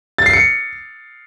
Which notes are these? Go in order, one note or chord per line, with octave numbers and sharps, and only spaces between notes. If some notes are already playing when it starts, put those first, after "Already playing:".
A6
C7
C#7